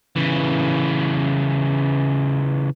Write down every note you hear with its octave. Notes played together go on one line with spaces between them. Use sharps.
C#3 E3